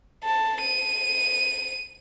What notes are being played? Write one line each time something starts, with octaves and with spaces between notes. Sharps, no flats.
A5
D#7